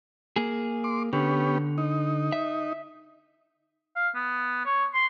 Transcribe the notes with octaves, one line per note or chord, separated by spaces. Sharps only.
A#3 G#4
C6 D6
D3 B3 C#4 G4
D#4
E5
F5
B3
C#5
C6